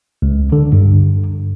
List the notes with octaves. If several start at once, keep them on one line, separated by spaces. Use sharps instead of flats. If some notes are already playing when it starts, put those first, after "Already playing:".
C#2
D3
G2